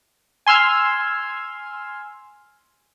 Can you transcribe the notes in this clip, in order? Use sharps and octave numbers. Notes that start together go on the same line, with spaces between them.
G#5 C6 E6 F6 G#6